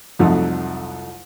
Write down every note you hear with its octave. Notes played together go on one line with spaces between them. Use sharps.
C2 F2 F3 F#3 A3 D#4